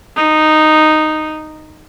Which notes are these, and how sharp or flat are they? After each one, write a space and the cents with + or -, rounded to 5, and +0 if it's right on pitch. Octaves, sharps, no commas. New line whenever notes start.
D#4 -5